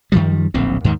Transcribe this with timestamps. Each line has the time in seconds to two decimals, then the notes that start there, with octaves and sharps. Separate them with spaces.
0.12 F#2 D#3 F3 G3
0.54 D1 A#1 D#2 C4
0.84 D#2 G#2 C3 D#3